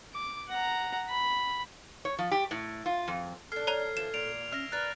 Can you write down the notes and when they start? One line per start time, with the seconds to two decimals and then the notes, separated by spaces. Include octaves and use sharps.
0.13 D6
0.49 F#5 A#5
1.09 B5
2.05 C#5
2.19 F3
2.32 G4
2.51 A2
2.86 F4
3.08 F2
3.52 D4 A4 G#5 F6 C7
3.67 C#5 A#5 G#6 F7
3.97 E3 F3 E7
4.14 A#2 D7 F7
4.52 C#4 E5 F6 A#6
4.72 A#4 B4 D5 F#6 A6